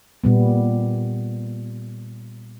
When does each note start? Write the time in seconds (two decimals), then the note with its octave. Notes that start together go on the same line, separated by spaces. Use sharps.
0.24 A#2 G3 B3